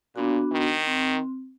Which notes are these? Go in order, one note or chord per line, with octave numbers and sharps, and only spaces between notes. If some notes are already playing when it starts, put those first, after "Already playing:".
A#2 B3 D4 F#4
D#3
C4